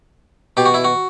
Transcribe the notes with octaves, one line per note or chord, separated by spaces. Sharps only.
B2 G4
F#4
E4
F#4